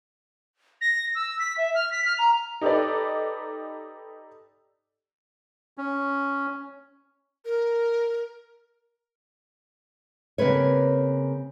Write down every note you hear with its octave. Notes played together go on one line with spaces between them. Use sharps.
A#6
E6
B6
E5
F6
B6
F6
A#5
D#4 G4 A4 B4 D5
C#4
A#4
C#3 A#3 C4 B4 C#5